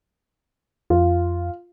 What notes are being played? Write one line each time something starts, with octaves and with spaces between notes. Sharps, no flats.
F2 F4